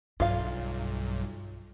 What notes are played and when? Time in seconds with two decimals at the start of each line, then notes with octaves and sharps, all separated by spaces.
0.20 B1 G2 F4 F5